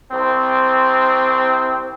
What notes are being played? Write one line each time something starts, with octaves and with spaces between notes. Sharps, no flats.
C2 C4